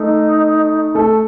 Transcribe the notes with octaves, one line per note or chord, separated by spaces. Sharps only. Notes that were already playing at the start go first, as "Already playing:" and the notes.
Already playing: A3 D#4 A4
A3 A4